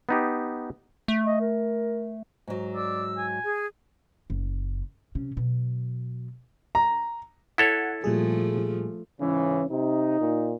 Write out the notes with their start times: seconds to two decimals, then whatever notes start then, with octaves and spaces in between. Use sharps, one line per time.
0.09 B3 D#4 G4
1.08 A3
1.25 D#5
1.41 A#4
2.48 G#2 F#3
2.75 D5 E6
3.18 G#5
3.44 G#4
4.30 F#1
5.15 C3 C#4
5.37 B2 F#3
6.75 A#5
7.58 E4 A4 C#5 F#5
8.04 A#2 F3 G3 A3 G#4
9.20 G#2 C#3 E3 C#4
9.70 C3 D#4
10.21 A#2